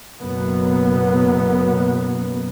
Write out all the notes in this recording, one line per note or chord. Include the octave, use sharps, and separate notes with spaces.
F#1 F#2 B2 F#3 A#3 B3